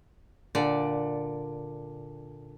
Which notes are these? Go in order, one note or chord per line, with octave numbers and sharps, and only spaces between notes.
A#2 D3 D5